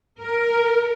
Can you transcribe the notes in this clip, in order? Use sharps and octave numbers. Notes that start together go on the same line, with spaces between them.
A#4